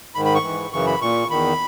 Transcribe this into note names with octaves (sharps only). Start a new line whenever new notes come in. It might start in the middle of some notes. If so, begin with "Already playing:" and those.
G#2 D#3 B5
B5
C#6
G#2 E3
F#2 C#3 E3 C#6
B5
A#2 C#6
E2 D#3 B5